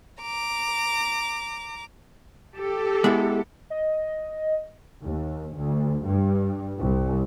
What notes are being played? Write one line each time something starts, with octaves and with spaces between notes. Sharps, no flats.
A#5 D6
G4 A4
G#3 B3 E4
D#5
D#2
D2
G2
C2